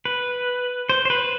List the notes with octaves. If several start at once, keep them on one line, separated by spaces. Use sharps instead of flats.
B4
C5
C5
B4